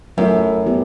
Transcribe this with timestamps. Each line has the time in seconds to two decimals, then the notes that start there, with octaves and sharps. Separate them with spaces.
0.17 F#2 F#3 A3 E4 A4
0.66 F#3 B3 E4 G4